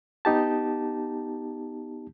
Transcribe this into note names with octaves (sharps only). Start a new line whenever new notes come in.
B3 D#4 G4 A5